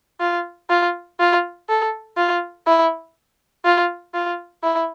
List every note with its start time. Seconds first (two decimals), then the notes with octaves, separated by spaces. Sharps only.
0.20 F4
0.70 F4
1.20 F4
1.69 A4
2.17 F4
2.67 E4
3.65 F4
4.14 F4
4.63 E4